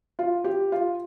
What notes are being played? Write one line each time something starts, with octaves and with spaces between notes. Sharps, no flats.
F4
G4
F4